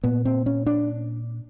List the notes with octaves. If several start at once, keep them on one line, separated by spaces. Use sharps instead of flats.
A#2 B3
C4
C#4
D4